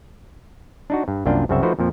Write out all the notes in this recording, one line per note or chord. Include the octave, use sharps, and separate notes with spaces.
D4 D#4 F#4
G2
C2 F#2 A#3 D4 F4 G5
C2 F#2 C#3 C4 F#4 E5
F3 A3 D#4 F#4 B4 C5
F2 A#2 F3